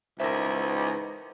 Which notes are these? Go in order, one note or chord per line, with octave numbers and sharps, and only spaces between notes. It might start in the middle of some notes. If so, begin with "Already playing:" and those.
C#2 G#2 E3 D#4 A#4 C5 E5